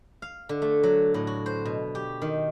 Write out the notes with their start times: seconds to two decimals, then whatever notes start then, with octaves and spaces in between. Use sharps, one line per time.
0.22 F5
0.49 D3
0.62 A3
0.83 F#3
1.14 A2
1.27 F#4
1.46 C5
1.65 B2
1.95 G4
2.22 D#3